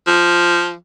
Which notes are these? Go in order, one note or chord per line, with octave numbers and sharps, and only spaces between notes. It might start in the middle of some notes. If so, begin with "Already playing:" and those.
F3